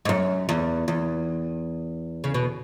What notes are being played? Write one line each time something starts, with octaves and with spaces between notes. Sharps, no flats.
G#2
F#2
E2
E2
C#3
B2